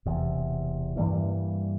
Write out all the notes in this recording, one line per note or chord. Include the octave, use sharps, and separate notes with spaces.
E1 E2 C3
G2 E3 G3 A#3